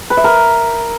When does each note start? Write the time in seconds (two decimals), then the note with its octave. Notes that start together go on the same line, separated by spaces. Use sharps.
0.10 B4
0.17 E5
0.24 A#4